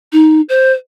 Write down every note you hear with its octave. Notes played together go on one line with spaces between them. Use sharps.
D#4
C5